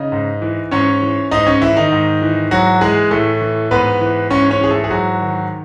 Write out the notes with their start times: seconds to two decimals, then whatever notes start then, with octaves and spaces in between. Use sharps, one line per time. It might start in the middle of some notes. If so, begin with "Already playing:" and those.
Already playing: C#3 D#4 D#5
0.12 G#2
0.42 E3
0.71 G#2 C#4 C#5
1.02 E3
1.31 G#2 D#4 D#5
1.47 C#4 C#5
1.61 E3 E4
1.77 D#3 D#4
1.91 G#2
2.22 E3
2.51 G#2 F#3 F#4
2.81 E3 G#3 G#4
3.11 A2 A3 A4
3.41 E3
3.71 G#2 B3 B4
4.01 E3
4.30 G#2 C#4 C#5
4.50 C#4 C#5
4.61 E3 G#4
4.71 A3 A4
4.84 G#4
4.90 G#2 F#3 F#4
5.21 D#3